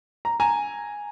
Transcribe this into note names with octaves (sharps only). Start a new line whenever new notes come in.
A#5
G#5 A#5